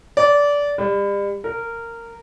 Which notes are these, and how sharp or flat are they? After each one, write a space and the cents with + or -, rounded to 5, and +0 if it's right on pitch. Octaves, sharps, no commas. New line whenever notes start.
D5 -20
G3 +35
A#4 -15